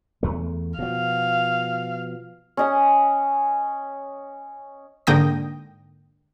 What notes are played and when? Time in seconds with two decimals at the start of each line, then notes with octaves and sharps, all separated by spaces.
0.23 E2 A3
0.79 B2 F3 F5
2.57 C#4 D#5 D#6
5.07 G#2 D3 A#3 G5 D#6 A#6